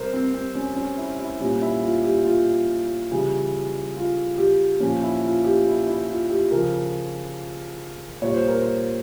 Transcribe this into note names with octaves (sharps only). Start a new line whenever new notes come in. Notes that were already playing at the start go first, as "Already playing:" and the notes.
Already playing: C3 G3 A#4 C5
C4
C4
C#4
C#4
E4
E4
A#2 G3 C#4
E4
F4
G4
F4
C#3 E3 G3
F4
G4
A#2 F3 C#4
E4
F4
G4
E4
E4
F4
G4
C#3 F3 A#4
A#2 G3 C#5
C5
A#4
C5